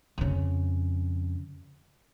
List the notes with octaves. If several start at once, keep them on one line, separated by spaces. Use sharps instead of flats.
F2 C#3